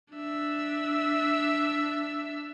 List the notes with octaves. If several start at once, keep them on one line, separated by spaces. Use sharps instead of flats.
D4 E5